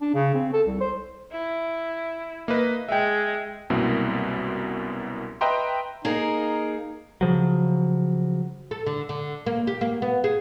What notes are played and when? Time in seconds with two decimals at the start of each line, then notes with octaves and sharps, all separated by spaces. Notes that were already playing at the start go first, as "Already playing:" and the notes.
0.01 D4
0.14 C#3
0.34 C4
0.53 A4
0.67 C2
0.80 C5
1.31 E4
2.48 A#3 B4 D#5
2.89 G#3 E5 G5
3.70 C2 F#2 B2 A#3 C4 E4
5.41 B4 D#5 E5 G5 A#5 C6
6.05 A#3 D#4 G#4 A#4
7.21 C#3 F3 F#3
8.71 A4
8.86 D3
9.09 D3
9.46 A#3
9.67 G4
9.81 A#3
10.02 B3
10.24 G#4